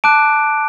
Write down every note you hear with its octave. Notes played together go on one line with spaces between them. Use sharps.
A5 D6 F#6 D7